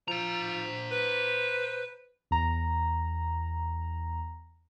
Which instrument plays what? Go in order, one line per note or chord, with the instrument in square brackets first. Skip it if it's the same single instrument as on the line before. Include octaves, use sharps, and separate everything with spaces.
[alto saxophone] F3 [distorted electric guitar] C5 A#5
[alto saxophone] B4
[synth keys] E2 A#5